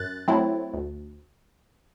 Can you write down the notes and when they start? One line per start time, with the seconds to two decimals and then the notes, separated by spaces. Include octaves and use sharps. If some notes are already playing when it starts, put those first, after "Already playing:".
Already playing: F#2 F#6 A6
0.28 F#3 A3 C4 E4
0.74 D2